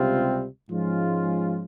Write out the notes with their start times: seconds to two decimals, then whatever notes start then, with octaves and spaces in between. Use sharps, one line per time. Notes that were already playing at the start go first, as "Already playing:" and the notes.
Already playing: C#2 C3 G3 C4 F4
0.70 G#2 F3 G#3 C#4 F4